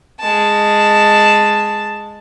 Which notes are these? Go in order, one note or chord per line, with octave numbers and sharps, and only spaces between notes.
G#3 A5